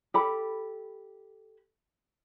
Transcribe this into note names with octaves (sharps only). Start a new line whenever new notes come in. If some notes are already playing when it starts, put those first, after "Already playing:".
G4 A4 B5